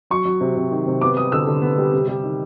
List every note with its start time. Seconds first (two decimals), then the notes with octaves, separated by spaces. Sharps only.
0.10 F#3 C#6
0.25 F#3
0.41 C3
0.56 C3
0.71 D#3
0.87 C3
1.01 B3 D6
1.17 G3 D#6
1.32 D3 E6
1.47 D3
1.62 B3
1.78 G3
1.93 C3
2.08 G3
2.23 D#3